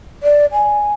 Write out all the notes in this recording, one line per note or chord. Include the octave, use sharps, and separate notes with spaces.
D5
G#5